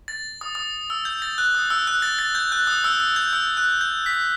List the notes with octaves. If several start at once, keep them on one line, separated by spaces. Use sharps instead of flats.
A6
D#6
D#6
E6
G6
A6
F#6
D#6
E6
F#6
A6
A6
G6
F#6
D#6
E6
E6
G6
E6
F#6
G6
B6